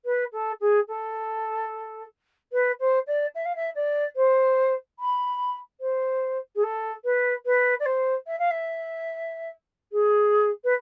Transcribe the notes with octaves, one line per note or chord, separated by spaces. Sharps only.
B4
A4
G#4
A4
B4
C5
D5
E5
F5
E5
D5
C5
B5
C5
G#4
A4
B4
B4
D5
C5
E5
F5
E5
G#4
B4